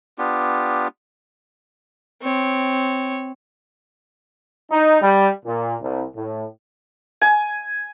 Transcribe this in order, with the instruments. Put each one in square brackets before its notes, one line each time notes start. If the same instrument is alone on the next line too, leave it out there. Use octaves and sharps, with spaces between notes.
[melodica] B3 D4 F4 G4
[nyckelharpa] C4 C#5
[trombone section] D#4
G3
A#2
C2
A2
[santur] G#5